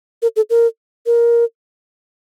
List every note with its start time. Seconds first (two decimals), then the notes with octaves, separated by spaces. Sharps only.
0.22 A#4
0.36 A4
0.50 A#4
1.06 A#4